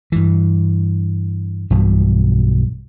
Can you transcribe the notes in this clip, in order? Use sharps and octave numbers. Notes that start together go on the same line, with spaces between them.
G2 E3
B1 G2 B2 E3